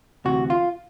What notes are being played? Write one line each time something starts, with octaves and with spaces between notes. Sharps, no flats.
D2 C3 E3 F#4
F4